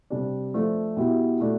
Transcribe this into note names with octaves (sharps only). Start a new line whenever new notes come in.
C3 G3 D4
F3 A3 D4
B2 B3 E4 G4
B2 A3 D4